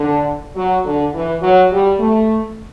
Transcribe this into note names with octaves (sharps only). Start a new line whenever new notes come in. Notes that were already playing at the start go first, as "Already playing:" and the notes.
Already playing: D3
F#3
D3
E3
F#3
G3
A3